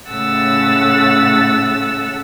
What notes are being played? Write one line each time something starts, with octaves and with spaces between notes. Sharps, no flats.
A2 C#3 A3 F#5 E6 A6